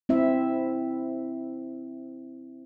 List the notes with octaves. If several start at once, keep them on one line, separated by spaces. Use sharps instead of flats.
C4 E4 E5